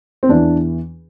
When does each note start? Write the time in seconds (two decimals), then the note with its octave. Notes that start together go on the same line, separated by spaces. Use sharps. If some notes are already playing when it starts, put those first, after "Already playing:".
0.23 C4
0.29 E2 E3 D4